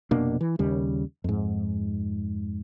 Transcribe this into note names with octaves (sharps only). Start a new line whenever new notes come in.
F1 B2 A#3 D4
E3
D#2 C#3 G3
F2 G#2